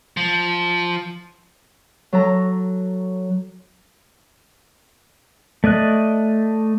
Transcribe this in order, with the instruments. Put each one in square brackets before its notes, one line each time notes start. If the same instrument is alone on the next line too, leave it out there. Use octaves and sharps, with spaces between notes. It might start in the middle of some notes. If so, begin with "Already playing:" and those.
[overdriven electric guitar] F3
[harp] F#3 A4 A#5
[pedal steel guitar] A3 D5 D#5 F#6